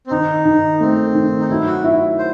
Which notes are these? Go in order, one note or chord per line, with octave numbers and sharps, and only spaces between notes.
C4
D#3 D#4
D#3
A3 C4
D#3
D#4
F#3 E4
F#4
E4
C5